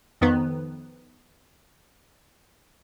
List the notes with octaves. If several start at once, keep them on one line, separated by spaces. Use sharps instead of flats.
F2 D#3 B3